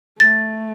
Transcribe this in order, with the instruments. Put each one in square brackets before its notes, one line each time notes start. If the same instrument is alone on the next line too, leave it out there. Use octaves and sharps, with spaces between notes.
[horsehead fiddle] A3 [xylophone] A6